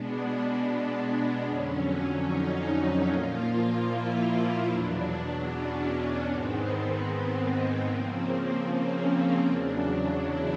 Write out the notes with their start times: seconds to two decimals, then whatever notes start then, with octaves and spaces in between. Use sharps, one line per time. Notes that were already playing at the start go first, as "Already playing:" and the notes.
Already playing: B2 G#3 B3 D4
1.44 F2 D3 F#3 C#4
2.25 D#4
3.05 A#2 F3 A#3 F4
3.85 E4
4.65 E2 B2 F#3 D4
5.46 C#4
6.26 G#2 D#3 G#3 B3 C4
7.05 B3
7.86 C#3 F3 A#3 C4
8.66 C#4
9.46 E2 C#3 F#3 D4
10.25 E4